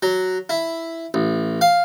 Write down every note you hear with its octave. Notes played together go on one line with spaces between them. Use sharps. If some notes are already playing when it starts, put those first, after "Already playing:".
F#3
E4
A1
F5